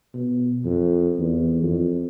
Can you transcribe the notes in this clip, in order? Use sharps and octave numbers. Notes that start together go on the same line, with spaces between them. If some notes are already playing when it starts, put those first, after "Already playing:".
B2
F2
E2
F2